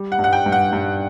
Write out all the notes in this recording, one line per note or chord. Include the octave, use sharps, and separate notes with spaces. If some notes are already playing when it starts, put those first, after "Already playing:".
Already playing: G3
F#5
G2
F#5
G5
G2
F#5
G2